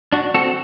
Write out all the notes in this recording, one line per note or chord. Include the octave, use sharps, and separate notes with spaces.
D4 F#4
C4 F#4 A4